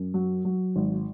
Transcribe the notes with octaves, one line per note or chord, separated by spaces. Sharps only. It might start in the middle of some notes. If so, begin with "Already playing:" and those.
Already playing: F#2
F#3
F#3
G#1